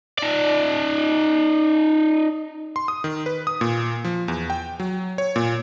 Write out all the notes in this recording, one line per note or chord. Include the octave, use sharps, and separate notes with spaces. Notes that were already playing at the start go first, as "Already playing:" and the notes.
D#4 D5
C6
D#6
D#3
B4
D#6
A#2
F3
E2
G5
F#3
C#5
A#2